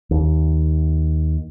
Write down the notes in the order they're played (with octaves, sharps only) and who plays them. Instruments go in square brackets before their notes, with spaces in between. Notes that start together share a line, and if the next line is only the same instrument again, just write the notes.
[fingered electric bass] D#2